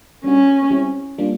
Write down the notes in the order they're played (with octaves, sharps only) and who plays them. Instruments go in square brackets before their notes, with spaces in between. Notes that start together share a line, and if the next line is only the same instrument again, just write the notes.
[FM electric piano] G3 B3 D4 F#4 [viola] C#4
[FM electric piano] G3 C4 E4 G4
G3 A#3 D4 F4